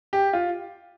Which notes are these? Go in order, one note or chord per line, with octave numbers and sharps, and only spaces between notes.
G4
F4